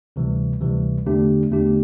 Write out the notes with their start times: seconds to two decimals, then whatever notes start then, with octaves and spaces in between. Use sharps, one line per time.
0.16 D2 C3 E3 G3
0.61 D2 C3 E3 G3
1.06 E2 D3 A3 D4 G4
1.51 E2 D3 A3 D4 G4